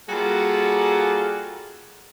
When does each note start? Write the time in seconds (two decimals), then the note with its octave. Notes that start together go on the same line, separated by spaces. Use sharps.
0.09 G3 A#3 F4 F#4 G#4 A4